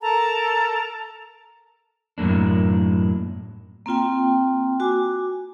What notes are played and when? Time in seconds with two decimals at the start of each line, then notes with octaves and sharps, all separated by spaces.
0.01 A4 A#4 A5 A#5
2.18 F#2 A2 F#3 A#3 D4
3.86 A#3 C4 F4 G5
4.80 F#4 G#5 D6